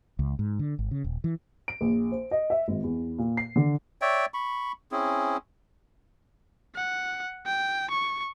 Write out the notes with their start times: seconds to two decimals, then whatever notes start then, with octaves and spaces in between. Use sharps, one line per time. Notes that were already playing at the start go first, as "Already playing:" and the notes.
0.19 C#2
0.39 G#2
0.59 D3
0.79 G#1
0.91 C#3
1.04 D#1
1.24 E3
1.68 D7
1.81 A#1
2.11 C5
2.31 D#5
2.50 E5
2.68 G#1
2.82 E2
3.18 A#2
3.37 C7
3.56 D3
4.02 C#5 D5 E5 G5
4.34 B5 C#6
4.91 C4 C#4 E4 G#4
6.75 F#5
7.46 G5
7.90 C#6